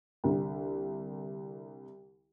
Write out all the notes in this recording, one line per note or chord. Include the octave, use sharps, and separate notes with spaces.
C2 D3